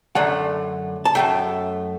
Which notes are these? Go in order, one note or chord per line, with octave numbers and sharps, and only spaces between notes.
F#2 D3 A3 F#5
A5
F#2 E3 A3 G5